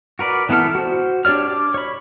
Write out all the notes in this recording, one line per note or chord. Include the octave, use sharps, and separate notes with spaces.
F#4 A#4 B4 D5
E3 B3 E4 A4 F6
F#4 C5
D4 G4 C#5 D5 F6
D6
C#5 B5